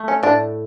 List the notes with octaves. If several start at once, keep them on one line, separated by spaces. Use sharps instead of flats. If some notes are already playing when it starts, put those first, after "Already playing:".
Already playing: A3
C#4
A2 D4